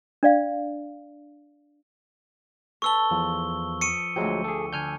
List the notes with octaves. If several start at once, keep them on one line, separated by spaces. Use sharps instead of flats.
D4 D5 F5
A4 B4 A5 C#6 E6 G7
E2 F3
C#6 D#6 C#7 D#7
D2 F3 F#3 G#3 G5
G#4 A4
D3 G#5 F6 G6